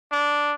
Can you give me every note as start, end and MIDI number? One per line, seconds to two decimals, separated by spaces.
0.12 0.53 62